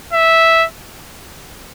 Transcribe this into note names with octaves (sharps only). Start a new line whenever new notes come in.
E5